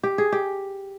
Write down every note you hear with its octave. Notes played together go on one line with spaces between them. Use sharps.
G4
G#4
G4